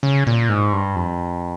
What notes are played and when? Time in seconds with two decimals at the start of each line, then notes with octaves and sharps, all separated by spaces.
0.03 C#3
0.27 A#2
0.49 G#2
0.73 G2
0.96 F2